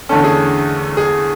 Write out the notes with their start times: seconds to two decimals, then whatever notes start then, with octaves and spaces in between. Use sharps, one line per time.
0.09 E2 D3 A3 C#4 A4
0.24 G#4
0.97 G#4